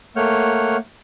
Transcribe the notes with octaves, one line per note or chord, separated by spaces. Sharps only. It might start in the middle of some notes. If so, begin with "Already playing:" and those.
A3 A#3 C#5 F#5 F6 G6